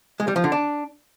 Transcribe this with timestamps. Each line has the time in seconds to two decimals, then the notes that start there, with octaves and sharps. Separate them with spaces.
0.20 G#3
0.28 G3
0.36 F3
0.44 D3
0.52 D4